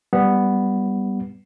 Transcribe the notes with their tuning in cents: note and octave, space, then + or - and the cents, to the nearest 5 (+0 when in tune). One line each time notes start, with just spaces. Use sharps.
G3 +0 B3 +0